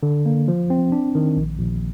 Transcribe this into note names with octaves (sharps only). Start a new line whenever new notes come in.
D3
A#3
F3
C4
D4
D#3
A#1
A#1